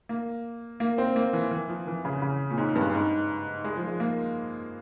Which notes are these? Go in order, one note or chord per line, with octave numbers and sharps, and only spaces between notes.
A#3
A#3
C4
A#3
E3
E3
F3
E3
C#3
C#3
A#2
G#2
G2
G#2
G#3
F3
G#3
A#3